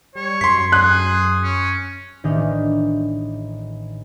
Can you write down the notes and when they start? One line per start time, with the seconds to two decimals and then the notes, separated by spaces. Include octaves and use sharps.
0.15 G3 C#5
0.41 F#2 C6 B6
0.72 G#4 F#6
1.43 C#4
2.24 A1 D#3 D4 D#6 F6 G6